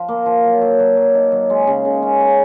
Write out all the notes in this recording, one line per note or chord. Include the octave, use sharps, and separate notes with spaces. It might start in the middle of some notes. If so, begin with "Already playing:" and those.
Already playing: F3 F4
A#3
F3
F#3
F#3
F#3
F#3
D#4
F#3
G#3
C#3
C#3
C#4
C#3